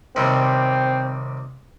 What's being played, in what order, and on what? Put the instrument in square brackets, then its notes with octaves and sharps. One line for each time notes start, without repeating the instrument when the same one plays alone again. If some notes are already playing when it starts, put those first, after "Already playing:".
[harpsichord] D#2 C3 G3 [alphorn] C4